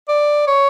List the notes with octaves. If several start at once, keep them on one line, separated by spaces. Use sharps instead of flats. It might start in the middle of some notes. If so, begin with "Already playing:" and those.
D5
C#5